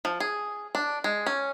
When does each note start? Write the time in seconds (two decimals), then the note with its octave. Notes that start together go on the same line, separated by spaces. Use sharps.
0.05 F3
0.20 G#4
0.75 D4
1.04 G#3
1.27 C#4